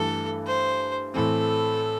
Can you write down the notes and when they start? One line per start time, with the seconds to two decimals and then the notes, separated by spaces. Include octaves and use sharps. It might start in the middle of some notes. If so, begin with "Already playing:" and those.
Already playing: G2 E3 A3 A4
0.46 C5
1.14 A2 E3 C4 A4